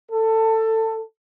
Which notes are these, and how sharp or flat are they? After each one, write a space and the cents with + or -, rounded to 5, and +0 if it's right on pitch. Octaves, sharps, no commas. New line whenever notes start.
A4 +20